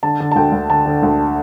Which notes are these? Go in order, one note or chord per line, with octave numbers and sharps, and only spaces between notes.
D3 A5
D3
A5
D2 G5
D2
D3 A5
D3
D2